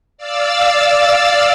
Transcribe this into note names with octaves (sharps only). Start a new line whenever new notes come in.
D5 F5 E6 A6